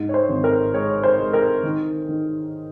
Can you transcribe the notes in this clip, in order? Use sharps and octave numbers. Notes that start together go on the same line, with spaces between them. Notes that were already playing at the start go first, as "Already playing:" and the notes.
Already playing: G#2
C#5
C5
G#1
A#4
G#3 C#5
C5
G#3
A#4
D#3
D#3